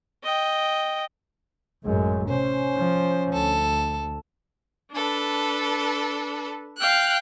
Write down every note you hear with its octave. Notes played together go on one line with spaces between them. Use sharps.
D#5 G5
A1 F#2 G#3
C3 C#4 C5
F3
D2 A4
D4 A4 B4
F5 G5 F#6